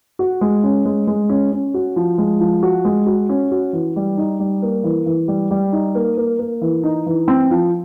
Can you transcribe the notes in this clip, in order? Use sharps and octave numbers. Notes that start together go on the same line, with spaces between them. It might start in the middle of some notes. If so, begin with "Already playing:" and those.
F#4
G#3
C#4
G#3
G#3
C#4
C#4
F#4
F3
G#3
F3
F#4
G#3
F#4
C#4
F#4
E3
G3
D#4
G3
A#3
E3
E3
G3
G3
D#4
A#3
A#3
A#3
E3
D#4
E3
C4
F3